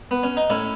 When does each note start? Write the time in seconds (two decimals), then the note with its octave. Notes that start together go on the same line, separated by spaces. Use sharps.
0.11 B3
0.23 C#4
0.37 D#4
0.50 A2 C#4 E4